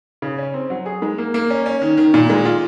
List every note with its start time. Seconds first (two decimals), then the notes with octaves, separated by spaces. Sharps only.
0.22 C#3
0.38 C#4
0.54 C4
0.70 F#3
0.86 G#4
1.02 G#3
1.18 A#3
1.34 A#3
1.50 C#4
1.66 C#4
1.82 D#3
1.97 D#3
2.14 A#2
2.30 G#3
2.45 F4